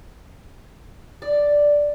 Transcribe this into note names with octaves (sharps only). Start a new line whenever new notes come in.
D5